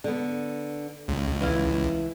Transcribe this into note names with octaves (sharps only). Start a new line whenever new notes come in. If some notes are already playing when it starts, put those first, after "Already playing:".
D3 B3
C#2
E3 E4 F5